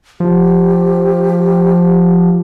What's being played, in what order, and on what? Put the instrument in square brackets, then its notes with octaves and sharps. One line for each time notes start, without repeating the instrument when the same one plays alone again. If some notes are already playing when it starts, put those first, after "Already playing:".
[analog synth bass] F3 [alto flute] G4